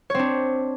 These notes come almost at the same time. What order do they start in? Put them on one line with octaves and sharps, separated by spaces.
C#5 C4 D4